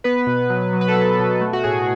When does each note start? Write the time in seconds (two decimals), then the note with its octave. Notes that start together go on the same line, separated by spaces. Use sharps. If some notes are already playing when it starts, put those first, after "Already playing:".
0.04 B3 B4
0.27 B2
0.50 F#3
0.73 F#3
0.81 B4
0.88 A4
0.95 F#3 B4
1.19 B2
1.41 A3
1.53 F#4
1.64 A2 G#4